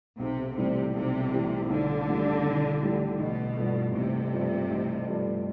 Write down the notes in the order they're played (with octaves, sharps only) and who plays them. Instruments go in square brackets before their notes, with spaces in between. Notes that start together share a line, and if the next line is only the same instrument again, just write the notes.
[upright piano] B1 [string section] C3
[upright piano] A2 E3 G3 [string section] C3
[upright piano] B1 [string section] C3
[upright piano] A2 E3 G3
[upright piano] B1 [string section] D3
[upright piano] A2 E3 G3
B1
A2 E3 G3
[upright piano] A1 [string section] B2
[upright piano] G2 F3 A3
[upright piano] A1 [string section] C3
[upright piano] G2 F3 A3
A1
G2 F3 A3